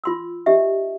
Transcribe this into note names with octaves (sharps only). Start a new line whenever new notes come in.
F4 C6 E6
D4 D#4 G4 D#5 E5